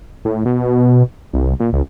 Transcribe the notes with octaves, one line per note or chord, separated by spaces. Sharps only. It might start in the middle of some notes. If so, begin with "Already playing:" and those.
A2
B2
C2
A#2
C#2